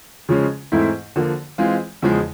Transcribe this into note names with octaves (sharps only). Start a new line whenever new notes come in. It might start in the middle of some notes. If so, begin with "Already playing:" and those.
C#3 F3 G#3 C#4
G#2 E3 A3 C4 E4
D3 F3 A#3
E3 G#3 C4 F4
E2 C#3 F3 G#3